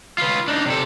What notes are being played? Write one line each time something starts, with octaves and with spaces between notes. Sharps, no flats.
F4 B4
D4 D#4
C3 A4